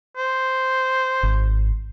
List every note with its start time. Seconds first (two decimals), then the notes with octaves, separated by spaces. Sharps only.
0.17 C5
1.23 G#1